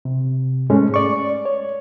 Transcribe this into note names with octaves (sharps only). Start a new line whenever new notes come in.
C3
G#2 G#3 A3 C#4
D5 C#6
C#5